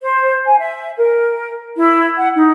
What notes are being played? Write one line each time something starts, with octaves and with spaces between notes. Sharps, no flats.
C5
G#5
E5
A#4
E4
F#5
D#4